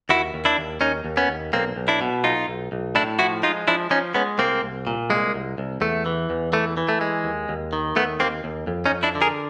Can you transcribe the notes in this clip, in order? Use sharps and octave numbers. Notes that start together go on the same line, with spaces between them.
D#2 E4 F#4
D#2
D4 E4
D#2
D#2 C#4 D#4
D#2
B3 C#4
D#2
B1 A#3 C4
B1
D4 E4
B2
B1 D#4 F4
B1
B1
A2 D4 E4
F3 E4 F#4
G#3 D#4 F4
F3 D4 E4
F3 C#4 D#4
G#3 B3 C#4
C2 A#3 C4
C2
A#2
C2 G#3 A#3
C2
C2
E2 A3
E3
E2
E3 A3
E3
A3
G#3
D#2
D#2
D#3
D#2 A3 B3
D#2 A#3 C4
D#2
F2
C#4 D#4
F2
D4 E4
D3
G#4 A#4